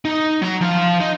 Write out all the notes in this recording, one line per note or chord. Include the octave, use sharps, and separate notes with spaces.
D#4
F#3 A#5
F3 F5
D#4